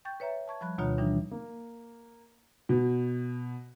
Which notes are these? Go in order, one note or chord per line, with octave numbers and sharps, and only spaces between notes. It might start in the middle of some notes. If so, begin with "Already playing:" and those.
G5 C#6 G6 A6
B4 C#5 E5 A#5
A5 C#6 G#6
F3 G3 B5 F#6 G#6
D2 B2 D#3 F4 C#5 A#5
E3 F3 G3 D4 D#4
A#3
B2